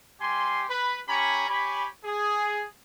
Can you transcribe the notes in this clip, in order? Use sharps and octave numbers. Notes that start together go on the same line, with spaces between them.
G3 G4 G#5 C6
B4 B5
C#4 G4 G#5 A#5 B5 C#6
G4 C#5 G#5 B5
G#4